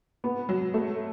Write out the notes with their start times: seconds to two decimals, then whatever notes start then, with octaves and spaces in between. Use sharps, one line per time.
0.24 B3
0.49 F#3
0.74 A3